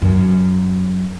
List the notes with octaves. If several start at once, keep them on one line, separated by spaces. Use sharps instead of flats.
F#2